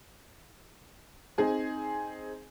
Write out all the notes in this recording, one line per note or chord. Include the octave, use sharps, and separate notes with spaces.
C4 D#4 G#4 G#5